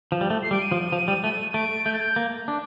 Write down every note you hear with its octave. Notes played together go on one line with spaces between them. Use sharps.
F3
G3
A3
C7
G3 D7
D#7
F3
F3
G3
A3
A3 D7
A3 G6
A6
G6
A#3
D4